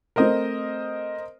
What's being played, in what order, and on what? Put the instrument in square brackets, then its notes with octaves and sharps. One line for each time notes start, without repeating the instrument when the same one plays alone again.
[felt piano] A3 C4 [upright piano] A#4 C5 D#5